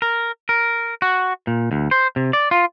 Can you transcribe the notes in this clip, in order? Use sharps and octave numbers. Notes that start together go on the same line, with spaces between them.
A#4
A#4
F#4
A#2
D2
C5
C3
D5
F4